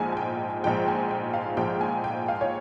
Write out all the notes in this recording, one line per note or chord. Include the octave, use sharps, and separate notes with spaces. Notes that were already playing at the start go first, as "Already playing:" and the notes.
Already playing: A#1 G#2 F3 G#3 G#5
G#5
G5
A#1 G#2 F3 G#3 G5
G#5
G5
F5
A#1 G#2 F3 G#3 G5
G#5
G5
F5
C#5